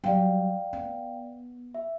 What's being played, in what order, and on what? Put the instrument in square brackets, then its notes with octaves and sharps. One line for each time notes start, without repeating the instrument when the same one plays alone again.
[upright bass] F#3 G3 [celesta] D5 F5 G5
[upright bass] B3
[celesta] E5